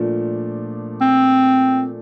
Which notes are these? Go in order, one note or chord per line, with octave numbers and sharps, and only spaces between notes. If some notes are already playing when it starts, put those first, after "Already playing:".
Already playing: A#2 F3 A3 D4
C4